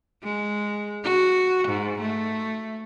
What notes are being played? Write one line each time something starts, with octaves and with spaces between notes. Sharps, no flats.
G#3
F#4
G#2
A3